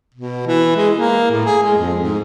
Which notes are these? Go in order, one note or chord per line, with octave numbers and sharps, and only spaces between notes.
B2
E3
G#3
A#3
A2
G#4
G#3
F2
G#2